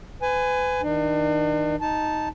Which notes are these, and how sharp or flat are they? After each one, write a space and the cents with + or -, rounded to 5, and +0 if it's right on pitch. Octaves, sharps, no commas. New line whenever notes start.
B4 +35 G#5 +0
D#3 +30 D4 +40
D#4 +0 A5 -5